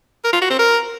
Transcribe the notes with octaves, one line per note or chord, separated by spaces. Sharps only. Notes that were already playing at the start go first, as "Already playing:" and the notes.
A#4
F4
F#4
C4
A#4